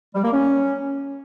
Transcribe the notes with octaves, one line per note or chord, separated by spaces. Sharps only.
G3
A#3
C#4